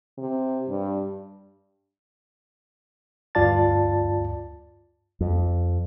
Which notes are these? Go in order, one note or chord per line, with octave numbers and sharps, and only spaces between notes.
C3
G2
D2 G2 F4 D5 A5 A6
F2